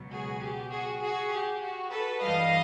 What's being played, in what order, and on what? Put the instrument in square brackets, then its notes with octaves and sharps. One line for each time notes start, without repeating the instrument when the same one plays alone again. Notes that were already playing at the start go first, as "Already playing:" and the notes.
Already playing: [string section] C#2 B2 F#3
F#4 G#4
G4
F#4 G#4
F#4 G#4
G4
F#4
A4 B4
G2 E3 G3 D#5 F5